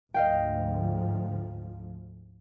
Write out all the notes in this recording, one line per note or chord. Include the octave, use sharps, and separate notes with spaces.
D2 G#2 F3 D#5 F5 G5